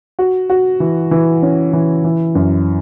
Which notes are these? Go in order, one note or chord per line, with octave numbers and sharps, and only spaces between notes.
F#4
F#4
E3
E3
C#4
E3
E3
F#2